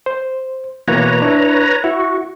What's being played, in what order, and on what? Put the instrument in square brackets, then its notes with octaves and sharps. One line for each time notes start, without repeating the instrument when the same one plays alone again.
[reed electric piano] C5
[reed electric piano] B2 E3 A#3 [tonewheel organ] B4 C#5 A#5
[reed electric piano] D4 E4
[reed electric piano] E4 [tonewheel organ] F#4